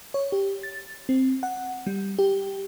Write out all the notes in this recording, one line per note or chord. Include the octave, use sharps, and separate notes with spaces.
C#5
G4
A6
C4
F#5
G3
G4